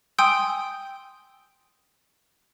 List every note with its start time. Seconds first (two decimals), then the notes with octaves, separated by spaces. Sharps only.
0.18 G5 G#5 C6 D#6 E6 G6